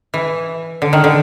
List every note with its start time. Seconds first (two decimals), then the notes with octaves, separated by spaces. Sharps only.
0.14 E3
0.82 D3
0.93 D#3
1.04 D3